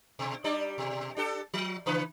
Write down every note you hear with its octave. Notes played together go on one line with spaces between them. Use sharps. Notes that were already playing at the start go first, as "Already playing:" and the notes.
B2
G3 D4 D5
B2
D4 G4 A4
F3
C#3 E3 B4